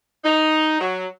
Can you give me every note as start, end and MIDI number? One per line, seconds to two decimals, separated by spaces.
0.25 0.77 63
0.80 1.06 54